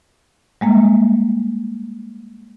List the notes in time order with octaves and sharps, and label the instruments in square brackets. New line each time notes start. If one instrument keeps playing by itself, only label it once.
[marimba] G3 G#3 A#3